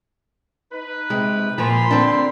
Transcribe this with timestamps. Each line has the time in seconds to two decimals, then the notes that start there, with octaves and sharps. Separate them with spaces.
0.72 D#4 B4
1.10 C3 G#3
1.58 A#2 F3 A#4 B5 C6
1.91 D3 C4 D4